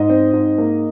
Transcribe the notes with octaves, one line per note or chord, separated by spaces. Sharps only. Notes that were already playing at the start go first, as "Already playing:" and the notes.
Already playing: G#2 D#5
C4
G#2
A#3